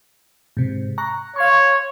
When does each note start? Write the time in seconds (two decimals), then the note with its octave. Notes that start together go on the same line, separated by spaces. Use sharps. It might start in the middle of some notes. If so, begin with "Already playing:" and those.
0.57 G#2 C3
0.98 A#5 C#6 F#6
1.36 C#5 F5 C6 C#6